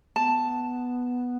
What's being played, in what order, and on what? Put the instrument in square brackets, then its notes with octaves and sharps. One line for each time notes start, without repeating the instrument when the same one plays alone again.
[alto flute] B3 [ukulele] A5